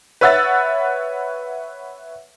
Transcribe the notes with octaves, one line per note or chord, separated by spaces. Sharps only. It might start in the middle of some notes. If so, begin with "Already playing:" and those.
B4 C#5 E5 F#5 E6 A6